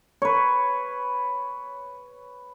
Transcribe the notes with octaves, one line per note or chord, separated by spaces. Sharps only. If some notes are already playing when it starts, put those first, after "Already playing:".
B4 C#5